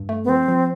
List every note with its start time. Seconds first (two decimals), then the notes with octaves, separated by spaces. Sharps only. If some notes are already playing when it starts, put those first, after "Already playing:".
Already playing: G2
0.09 A3
0.24 B3
0.29 F3 C4
0.48 F3